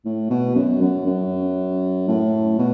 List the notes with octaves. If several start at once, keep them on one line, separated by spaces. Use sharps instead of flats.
A2
B2
F#2
F#2
F#2
A2
B2